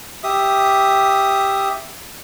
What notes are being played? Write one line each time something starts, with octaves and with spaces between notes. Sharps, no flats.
G4 E5 D#6